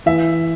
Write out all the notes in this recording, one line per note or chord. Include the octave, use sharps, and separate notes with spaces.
E3 E5